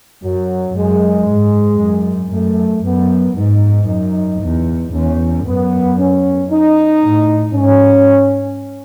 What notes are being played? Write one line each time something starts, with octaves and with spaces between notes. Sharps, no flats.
F#2 F#3
F#2 G#3
G#2
F#2
F#2 A3
F#2 B3
G#2 D#4
F#2
E2
E2 C#4
F#2 B3
C#4
D#4
A2
G#2 C#4